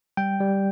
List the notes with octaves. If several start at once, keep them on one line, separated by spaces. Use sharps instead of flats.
G3 G5
G3